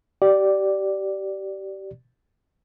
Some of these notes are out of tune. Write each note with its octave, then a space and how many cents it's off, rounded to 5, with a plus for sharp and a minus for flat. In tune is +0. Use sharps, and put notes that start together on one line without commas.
G4 -25 D5 +0